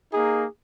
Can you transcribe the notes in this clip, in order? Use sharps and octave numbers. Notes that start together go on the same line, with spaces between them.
A#3 D#4 G#4